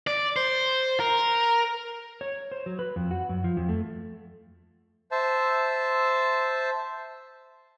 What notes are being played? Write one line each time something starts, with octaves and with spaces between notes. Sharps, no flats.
D5
C5
A#4
C#5
C5
F#3
B4
F2
F#4
F#2
F3
F2
A3
C5 E5 A5 E6